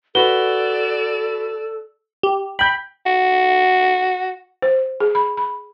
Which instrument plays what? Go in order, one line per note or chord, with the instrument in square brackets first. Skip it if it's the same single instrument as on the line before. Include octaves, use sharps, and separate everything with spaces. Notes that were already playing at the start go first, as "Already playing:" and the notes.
[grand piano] F#4 B4 [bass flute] A4 [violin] D5 E7 [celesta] G7
[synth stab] G4
[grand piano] G5 G6 [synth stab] B5
[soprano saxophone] F#4
[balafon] C5
G#4
B5
B5